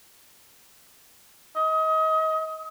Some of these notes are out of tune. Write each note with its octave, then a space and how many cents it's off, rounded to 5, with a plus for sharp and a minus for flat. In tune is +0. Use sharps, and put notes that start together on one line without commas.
D#5 +30